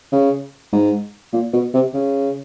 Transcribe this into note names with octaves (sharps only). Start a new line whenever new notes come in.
C#3
G#2
A#2
B2
C3
C#3